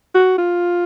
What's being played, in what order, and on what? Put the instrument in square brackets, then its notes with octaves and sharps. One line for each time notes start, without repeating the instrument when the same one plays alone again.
[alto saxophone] F#4
F4